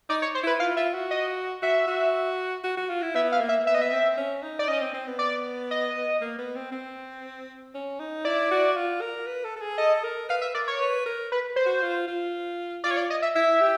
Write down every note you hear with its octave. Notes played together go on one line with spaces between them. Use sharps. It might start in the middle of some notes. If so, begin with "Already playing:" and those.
D#4 D5
C#5
C5
E4 B4
F4 F5
F4 E5
F#4
D#5
F#4 E5
F#4
F#4
F#4
F4
E4
B3 E5
F5
A#3
E5
A#3
B3 E5
D#5
E5
C4
C#4
D#4
D5
C#4 D#5
C4
C4
B3
D5
D#5
A#3
B3
C4
C4
C#4
D#4
E4 D5
F#4
F4
A#4
B4
A4
A4
G#4
A4 D#5
A#4
B4 F5
E5
A#4 D5
C#5
B4
A#4
B4
C5
F#4
F4
F4
F4 D5
C#5
D5
D#5
E5
E4 E5
G4